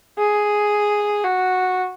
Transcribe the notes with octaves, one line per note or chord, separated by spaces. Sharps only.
G#4
F#4